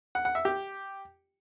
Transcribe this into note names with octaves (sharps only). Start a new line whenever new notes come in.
F#5
F#5
E5
G4